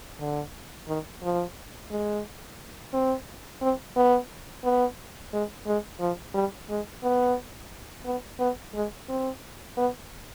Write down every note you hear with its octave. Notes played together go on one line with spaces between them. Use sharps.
D3
D#3
F3
G#3
C4
C4
B3
B3
G#3
G#3
F3
G3
G#3
B3
B3
B3
G#3
C4
B3